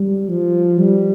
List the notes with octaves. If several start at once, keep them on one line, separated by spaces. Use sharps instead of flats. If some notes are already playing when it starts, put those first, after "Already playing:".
Already playing: G3
F3
G3